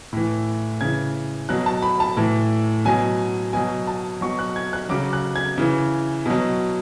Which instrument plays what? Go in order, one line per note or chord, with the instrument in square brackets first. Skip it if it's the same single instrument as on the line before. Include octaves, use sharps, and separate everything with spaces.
[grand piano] A2 E3
C#3 E3 G#6
B2 F#3 F#6
A5
B5
A5
A2 E3
B2 F#3 G#5
B2 F#3 G#5
A5
B2 F#3 C#6
F#6
G#6
F#6
C#3 F#3 D6
F#6
G#6
C#3 E3
B2 F#3